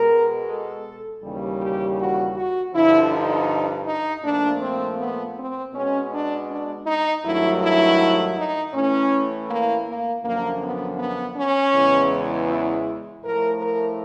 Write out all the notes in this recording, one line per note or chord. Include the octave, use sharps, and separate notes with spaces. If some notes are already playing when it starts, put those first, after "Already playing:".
Already playing: B2 G#3 A#4
A4
D#2 C#3 E3 G3
G4
F#4
F#4
G2 D3 F3 E4
D#4
D#4
A#2 F3 A3 D4
C4
B3
C4
B2 G#3 C#4
D4
D4
D#4
G2 D#3 F#3 A3 E4
E4
D#4
A2 E3 A3 C#4
A#3
A#3
F#2 D3 F3 A#3
B3
B3
C#4
E2 C#3 E3 G#3
E4
A2 F3 A3 A#4
A#4